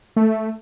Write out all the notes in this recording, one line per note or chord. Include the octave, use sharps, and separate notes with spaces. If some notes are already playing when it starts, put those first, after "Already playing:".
A3